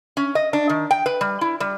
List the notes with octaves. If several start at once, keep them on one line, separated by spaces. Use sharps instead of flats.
C#4
D#5
D4
D#3
G5
B4
G3
E4
G3